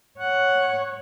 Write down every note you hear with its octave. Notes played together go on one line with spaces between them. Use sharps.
C#5 F#5